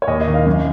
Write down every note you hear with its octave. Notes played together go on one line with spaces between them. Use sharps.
C#5
D#2 D#5
D#5
D#3
F5
F#2